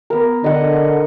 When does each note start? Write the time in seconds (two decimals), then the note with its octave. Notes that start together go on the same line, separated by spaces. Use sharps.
0.10 B3 A#4
0.44 D3 D#5 F#5 C6